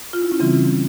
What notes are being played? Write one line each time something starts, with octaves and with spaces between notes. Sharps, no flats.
F4
E4
C#4
C#3 E3 G3 C4